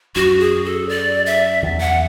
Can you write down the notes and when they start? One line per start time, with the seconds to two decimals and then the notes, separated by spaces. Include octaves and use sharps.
0.16 F#2 F#4
0.40 G#4
0.65 A4
0.89 D5
1.26 E5
1.62 E2
1.80 F#5